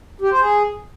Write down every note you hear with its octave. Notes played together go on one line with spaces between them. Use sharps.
G4
C5
G#4